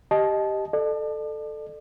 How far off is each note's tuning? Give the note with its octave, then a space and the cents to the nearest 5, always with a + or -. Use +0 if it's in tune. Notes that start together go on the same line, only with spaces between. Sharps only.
G4 +0 D#5 +0 A5 -25
A4 +0 D5 +40